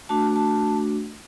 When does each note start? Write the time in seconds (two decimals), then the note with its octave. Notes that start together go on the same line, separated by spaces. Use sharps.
0.09 A3 D4 F#4 A5
0.36 A5